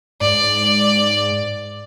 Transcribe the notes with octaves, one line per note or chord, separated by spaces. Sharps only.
G#2 D5